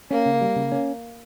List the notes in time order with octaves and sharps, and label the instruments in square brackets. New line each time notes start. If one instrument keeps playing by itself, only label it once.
[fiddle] A#3 [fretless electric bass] C#4
[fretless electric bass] C#3
G3
C#3
C#4